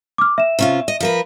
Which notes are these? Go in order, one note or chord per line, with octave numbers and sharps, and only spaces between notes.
D6 F6
E5 E7
C3 C#4 F4
D#5
F3 A#4 B4